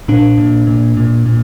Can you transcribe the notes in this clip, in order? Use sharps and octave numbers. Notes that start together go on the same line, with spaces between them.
A#2 D4
A#2
A#2
A#2
A#2